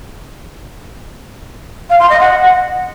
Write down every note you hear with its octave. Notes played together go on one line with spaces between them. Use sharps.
F5
C6
D#5
F#5